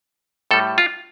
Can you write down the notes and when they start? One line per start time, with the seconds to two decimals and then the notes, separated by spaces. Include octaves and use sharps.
0.51 A2 G3 A4
0.78 F4